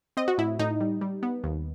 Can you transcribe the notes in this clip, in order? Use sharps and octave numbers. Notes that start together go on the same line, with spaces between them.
C4 D#5
F#4
A2 E4
A2 D#4
G3
G3
B3
D#2